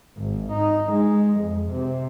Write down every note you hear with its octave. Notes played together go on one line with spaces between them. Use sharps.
G#1
D#4
G#3
F2
C3